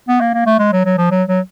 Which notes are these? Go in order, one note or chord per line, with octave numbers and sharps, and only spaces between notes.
B3
A#3
A#3
A3
G#3
F#3
F#3
F3
F#3
F#3